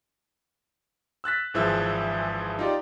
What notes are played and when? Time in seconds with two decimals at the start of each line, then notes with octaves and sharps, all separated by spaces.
1.24 E6 F#6 A6 B6
1.54 G#1 E3 F3 G#4 E5 E6
2.59 D#4 F4 G4 D5